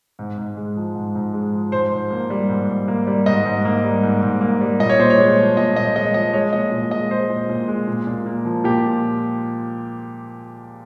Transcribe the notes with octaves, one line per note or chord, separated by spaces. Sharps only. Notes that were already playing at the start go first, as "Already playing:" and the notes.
G#2
G#2
G#3
F3
G#2
G#2
G#3
F3
G#2 C5
G#2
A#3
G3
G#2
G#2
A#3
G3
G#2 D#5
G#2
A#3
G3
G#2
G#2
A#3
G3
A#2 D#5
C#5
A#2 C5
C#5
G#3
F3
A#2 D#5
A#2 D#5
G#3 D#5
F3 D#5
G#3 C#5
A#2 D#5
A#2
G#3 D#5
G#3 C5
A#2
A#2
G#3
A#2
A#2
A#3
F3
A#2 G4